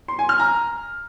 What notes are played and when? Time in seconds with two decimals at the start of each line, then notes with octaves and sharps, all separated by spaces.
0.08 C6
0.19 G#5
0.29 F6
0.39 A#5